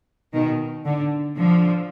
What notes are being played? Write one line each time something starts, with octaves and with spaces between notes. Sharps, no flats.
B2 D#3
D3
D3 F3